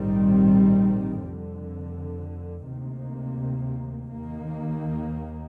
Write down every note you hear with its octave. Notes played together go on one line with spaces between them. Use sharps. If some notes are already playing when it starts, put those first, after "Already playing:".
Already playing: A#1 G#2 D#3 G3 C4
F1 F2 D3
D2 C3 D#3 A#3
D#2 D#3 A#3